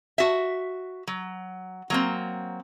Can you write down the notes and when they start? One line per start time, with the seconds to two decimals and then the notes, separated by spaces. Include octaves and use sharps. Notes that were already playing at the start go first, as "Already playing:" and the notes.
0.18 F#4 E5
1.07 F#3
1.90 F#3 A#3 C4